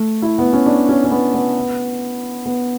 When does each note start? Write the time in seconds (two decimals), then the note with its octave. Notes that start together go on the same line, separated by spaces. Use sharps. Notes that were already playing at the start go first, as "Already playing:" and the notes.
Already playing: A3
0.22 E4
0.39 B3
0.53 C#4
0.66 D4
0.89 C#4
1.04 C#4
1.11 B3
1.34 B3
2.46 B3